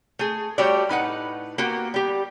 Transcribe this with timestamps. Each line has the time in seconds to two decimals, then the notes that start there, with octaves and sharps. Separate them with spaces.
0.19 A3 G#4
0.58 G3 A3 F#4 G4 C#5 D5
0.89 A2 D#4 B4 F#5
1.58 A#3 B3 F#4 G4
1.94 G3 G4